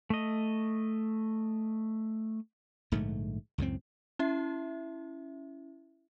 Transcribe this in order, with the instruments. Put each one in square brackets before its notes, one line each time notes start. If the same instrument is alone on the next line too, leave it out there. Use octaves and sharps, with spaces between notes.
[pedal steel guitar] A3 D#5
[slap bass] A#1 G#2 D3 A3
C#2 F#2 A2 C4
[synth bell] C#4 E4 E5